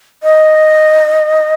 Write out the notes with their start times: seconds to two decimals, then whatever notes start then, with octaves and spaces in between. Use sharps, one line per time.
0.23 D#5